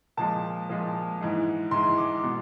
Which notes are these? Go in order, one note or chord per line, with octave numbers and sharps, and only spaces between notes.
A#2 F3 G#3 A5
A#2 F3 G#3
G#2 E3 G#3
G#2 E3 G#3 C6
D6
B2 G#3